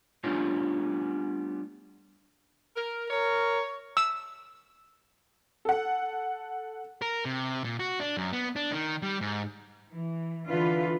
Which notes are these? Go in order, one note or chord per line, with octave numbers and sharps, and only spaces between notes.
G3 A3 B3 C#4 D4 F4
A#4
A#4 C#5
E6
A4 F#5
A#4
C3
A#2
F#4
D4
F#2
B3
D4
D#3
G3
G#2
E3
D3 E3 F4 B4